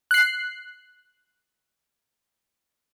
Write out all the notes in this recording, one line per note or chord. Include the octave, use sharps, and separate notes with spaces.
F#6 C7